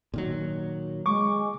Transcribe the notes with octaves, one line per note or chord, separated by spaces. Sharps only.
A#2 D#3 F#3
G#3 C#6 D6